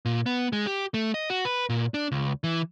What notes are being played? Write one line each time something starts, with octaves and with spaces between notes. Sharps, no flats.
A#2
B3
G#3
G4
A3
D#5
F#4
B4
A#2
D4
C#2
E3